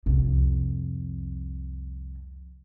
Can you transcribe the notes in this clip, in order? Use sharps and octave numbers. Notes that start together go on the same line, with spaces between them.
C2 F2